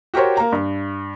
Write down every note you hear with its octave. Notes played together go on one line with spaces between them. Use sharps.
F#4 G4 A#4 C5 C#5
A#3 A#5
G2